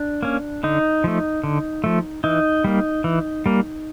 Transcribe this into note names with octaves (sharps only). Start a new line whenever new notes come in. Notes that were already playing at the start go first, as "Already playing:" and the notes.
Already playing: D4
A#3 C#4
D3 D#4
F3 A3
D3
F3 A3
E3 D#4
G3 A#3
E3
G3 A#3